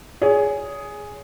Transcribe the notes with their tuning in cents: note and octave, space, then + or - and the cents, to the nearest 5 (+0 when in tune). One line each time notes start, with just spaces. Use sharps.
G#4 +0 C#5 +30